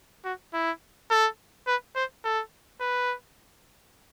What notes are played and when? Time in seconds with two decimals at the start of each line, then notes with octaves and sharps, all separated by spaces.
0.24 F#4
0.54 E4
1.11 A4
1.67 B4
1.95 C5
2.24 A4
2.81 B4